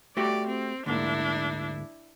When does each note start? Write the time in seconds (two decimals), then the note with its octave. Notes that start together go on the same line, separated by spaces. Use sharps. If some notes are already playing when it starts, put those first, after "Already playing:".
0.17 A3 F#4 G4 D5
0.47 C4
0.86 D2 G#2 A#3 D4 E4